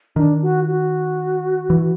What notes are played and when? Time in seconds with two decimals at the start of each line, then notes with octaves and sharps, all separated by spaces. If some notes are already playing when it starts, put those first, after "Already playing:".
0.16 D#3 D4
0.42 F#4
0.68 F#4
1.70 E3